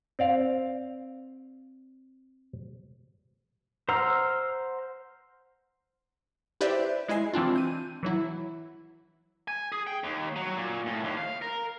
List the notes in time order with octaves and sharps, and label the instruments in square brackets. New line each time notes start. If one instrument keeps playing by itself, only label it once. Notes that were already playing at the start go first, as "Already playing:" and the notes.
[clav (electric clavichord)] C4 D5 F5
[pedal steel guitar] C5 F#5 A#5 E6 F6
[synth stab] E4 G4 B4 C5 D5 E5
G#3 E4 D#5 G#5 C7
E3 C4 D4 F4
G6 D#7
E3 F#3 E4
[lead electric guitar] G#5
G#4
G5
D#2
F#3
A#2
A2
D#2
F5
A#4